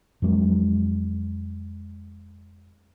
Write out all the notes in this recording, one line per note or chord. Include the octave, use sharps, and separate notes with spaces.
F2 F#3 G#3